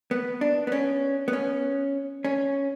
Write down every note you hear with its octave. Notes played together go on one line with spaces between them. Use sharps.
B3
D4
B3
C#4
B3
C#4
C#4